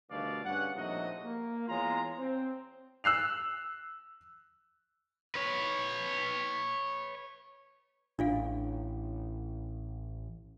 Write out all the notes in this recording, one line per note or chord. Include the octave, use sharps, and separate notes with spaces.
D2 B2 D#3 G3 D5 F5
G2 C#3 C#4 F#5
A#1 A2 C3 D#4 F#4 D#5
A#3
E2 G#3 F4 C#5 A#5
C4
E6 F#6 C7 F7
B4 C#5
A1 D4 F4 F5